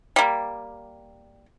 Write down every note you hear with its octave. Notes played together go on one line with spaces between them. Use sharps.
G3 A#3